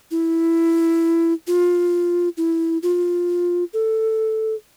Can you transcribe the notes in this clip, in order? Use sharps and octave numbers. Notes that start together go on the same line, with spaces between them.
E4
F4
E4
F4
A4